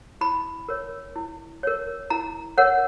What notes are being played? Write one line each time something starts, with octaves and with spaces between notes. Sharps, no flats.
E4 B5
A#4 C#5
E4
A#4 C#5
E4 A#5
A#4 C#5 F#5